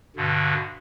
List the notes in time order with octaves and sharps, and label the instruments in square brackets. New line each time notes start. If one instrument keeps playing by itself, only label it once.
[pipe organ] G2 B2 D3